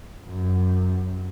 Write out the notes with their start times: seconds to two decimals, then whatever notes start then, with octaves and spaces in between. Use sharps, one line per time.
0.26 F#2